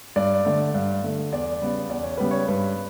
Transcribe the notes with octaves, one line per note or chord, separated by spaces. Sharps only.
G2 D5
D3 A3
G2
D3 A3
E2 D5
C#3 G3 B3
E2 D5
C#5
C#3 G3 B3 B4
C#5
G2 B4